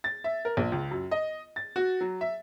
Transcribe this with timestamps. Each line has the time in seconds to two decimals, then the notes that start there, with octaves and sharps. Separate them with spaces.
0.04 A6
0.24 E5
0.45 A#4
0.57 A#1
0.72 C#2
0.91 F#2
1.11 D#5
1.56 A6
1.76 F#4
2.01 F#3
2.21 E5